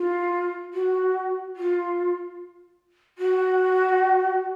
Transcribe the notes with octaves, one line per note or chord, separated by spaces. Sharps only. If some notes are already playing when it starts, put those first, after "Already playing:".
Already playing: F4
F#4
F4
F#4